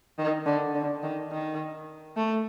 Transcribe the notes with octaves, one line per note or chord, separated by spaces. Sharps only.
D#3
D3
D3
D#3
D#3
A3